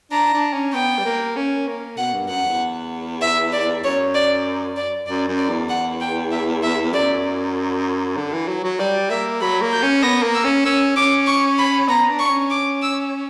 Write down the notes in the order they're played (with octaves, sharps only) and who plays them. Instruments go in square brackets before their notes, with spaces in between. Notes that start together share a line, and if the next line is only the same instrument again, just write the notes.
[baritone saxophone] D4 [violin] A#5
[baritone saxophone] D4
C#4
[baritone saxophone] B3 [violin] G5
[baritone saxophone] G3
A#3
C#4
A#3
[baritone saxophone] B2 [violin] F#5
[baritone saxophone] G2
[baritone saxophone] F#2 [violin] F#5
[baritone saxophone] E2
[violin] E5
D5
[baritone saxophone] F#2 [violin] C#5
[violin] D5
D5
[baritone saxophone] F#2 [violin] D5
[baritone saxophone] F#2
[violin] D5
[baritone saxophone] E2
[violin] F#5
G5
E5
E5
[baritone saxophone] F#2 [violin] D5
[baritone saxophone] D3
E3
F#3
F#3
[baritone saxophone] G3 [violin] D5
[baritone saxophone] A#3 [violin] E5
[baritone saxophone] F#3 [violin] B5
[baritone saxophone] A#3
[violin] G6
[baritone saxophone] C#4
[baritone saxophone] B3 [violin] A#6
[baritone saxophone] A#3
[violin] E6
[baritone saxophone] C#4
[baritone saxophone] C#4 [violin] E6
[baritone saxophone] C#4 [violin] D6
[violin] C#6
B5
[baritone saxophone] B3 [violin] A#5
[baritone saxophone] D4
[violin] C#6
[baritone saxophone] C#4
[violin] D6
E6